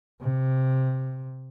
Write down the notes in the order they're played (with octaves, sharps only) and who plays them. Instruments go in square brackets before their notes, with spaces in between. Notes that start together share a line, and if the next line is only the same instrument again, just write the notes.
[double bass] C3